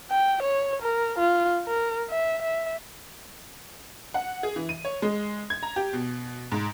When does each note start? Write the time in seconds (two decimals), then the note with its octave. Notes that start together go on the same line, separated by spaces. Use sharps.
0.10 G5
0.43 C#5
0.82 A#4
1.19 F4
1.67 A#4
2.10 E5
2.42 E5
4.14 F#5
4.43 G#4
4.56 E3
4.69 D#7
4.85 C#5
5.02 G#3
5.50 G#6
5.63 A#5
5.76 G4
5.93 B2
6.52 G#2